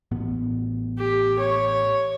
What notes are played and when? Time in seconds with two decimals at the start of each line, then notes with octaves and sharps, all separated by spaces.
0.11 A1 A2 B3
0.98 G4
1.38 C#5